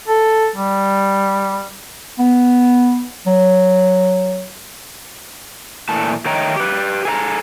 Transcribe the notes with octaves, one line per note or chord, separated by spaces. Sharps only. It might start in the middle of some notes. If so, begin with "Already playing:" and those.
A4
G3
B3
F#3
A#2 E3 A3 A5
D#3 A3 C#5 D#5 G5 A#5
G4 B4
G#4 A4 E5 A#5